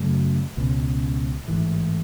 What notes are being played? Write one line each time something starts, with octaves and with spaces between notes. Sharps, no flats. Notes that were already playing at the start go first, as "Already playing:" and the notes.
Already playing: F#2 C#3 F#3 A3
C#2 B2 A3 C#4
A1 G#2 E3